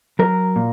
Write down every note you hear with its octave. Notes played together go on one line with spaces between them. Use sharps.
F#3 A#4
A#2